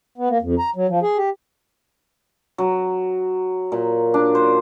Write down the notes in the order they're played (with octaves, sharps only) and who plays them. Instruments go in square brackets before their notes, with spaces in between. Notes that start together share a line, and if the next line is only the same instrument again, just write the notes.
[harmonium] B3
A#3
F2
A#5
F#3
F3
G#4
G4
[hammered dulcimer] F#3
A#2
D4
C5